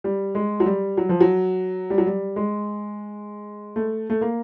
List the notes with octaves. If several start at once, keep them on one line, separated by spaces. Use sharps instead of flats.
G3
G#3
F#3
G3
F#3
F3
F#3
G3
F#3
G3
G#3
A3
A3
A#3